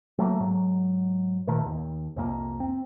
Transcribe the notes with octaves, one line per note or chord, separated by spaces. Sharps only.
F#3 A3 A#3
G#2 F#3
A#2 D#3 A3
D#2
C2 F2 A#3
C4